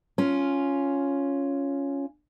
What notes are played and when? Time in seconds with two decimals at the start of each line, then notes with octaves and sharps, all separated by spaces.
0.18 C#4 F4